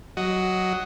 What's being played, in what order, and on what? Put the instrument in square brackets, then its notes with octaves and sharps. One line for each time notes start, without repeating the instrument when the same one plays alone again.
[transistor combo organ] F#3 F#4 D#5